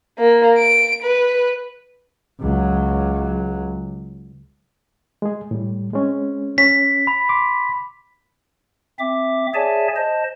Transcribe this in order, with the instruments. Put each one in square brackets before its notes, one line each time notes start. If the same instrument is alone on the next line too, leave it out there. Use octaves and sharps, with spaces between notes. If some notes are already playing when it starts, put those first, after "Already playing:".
[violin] A#3
D7
B4
[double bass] C#2 F#3
[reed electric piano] G#3 G#4
A2 G3
G#3 C4 C#4
[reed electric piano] C#4 [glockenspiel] B6
[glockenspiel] B5
[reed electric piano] C6 D6
[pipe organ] C4 E5 D6
G#4 C#5 D5 E5 G#5 A5
C5 D#5 A5